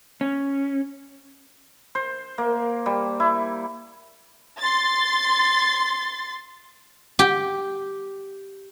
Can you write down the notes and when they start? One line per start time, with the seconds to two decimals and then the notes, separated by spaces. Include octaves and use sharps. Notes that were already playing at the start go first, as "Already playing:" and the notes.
0.21 C#4
1.95 C5
2.38 A#3
2.86 G3
3.20 E4
4.60 C6 A6
7.19 G4